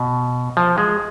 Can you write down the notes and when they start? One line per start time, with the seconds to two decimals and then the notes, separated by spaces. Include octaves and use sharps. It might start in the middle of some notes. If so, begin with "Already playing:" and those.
Already playing: B2
0.57 F3
0.78 G#3